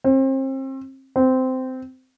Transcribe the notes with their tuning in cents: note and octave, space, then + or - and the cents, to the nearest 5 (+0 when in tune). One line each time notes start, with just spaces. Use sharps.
C4 +35
C4 -15